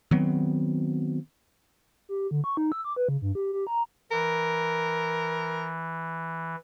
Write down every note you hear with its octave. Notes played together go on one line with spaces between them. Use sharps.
D#3 F#3 B3 C4
G4
D3
C#6
D#4
E6
D6
B4
C#3
G2
G4
G4
A#5
E3 A#4